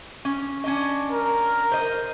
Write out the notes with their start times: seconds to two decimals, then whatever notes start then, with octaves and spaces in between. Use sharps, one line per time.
0.25 C#4
0.64 C#4 D4 D#5
1.11 A#4
1.72 C5 D#5